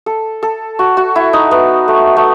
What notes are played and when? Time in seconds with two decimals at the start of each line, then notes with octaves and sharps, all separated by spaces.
0.06 A4
0.43 A4
0.79 F#4
0.97 F#4
1.16 E4
1.33 D#4
1.51 B3
1.88 A3
2.17 A3